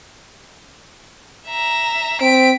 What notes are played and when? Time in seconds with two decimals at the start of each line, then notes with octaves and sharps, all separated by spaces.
1.47 E5 A#5
2.21 C4 B6 D7